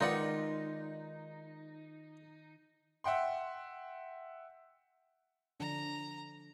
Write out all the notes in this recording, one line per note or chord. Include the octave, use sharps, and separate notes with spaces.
D#3 G#3 D#4 F4 B4 D5 F#5
E5 F#5 G5 C6
D3 F3 D4 A#5